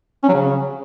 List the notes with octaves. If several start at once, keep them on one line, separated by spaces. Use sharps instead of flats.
C#4
F#3
C#3